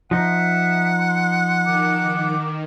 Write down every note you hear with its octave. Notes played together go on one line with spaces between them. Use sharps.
F3 D#4 E5 F#5
C6
D#3 D6